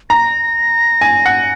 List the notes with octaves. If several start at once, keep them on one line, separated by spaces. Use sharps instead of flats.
A#5 A#6
G#5
F#5